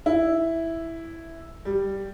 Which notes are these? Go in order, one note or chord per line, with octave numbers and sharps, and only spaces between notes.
E4
G3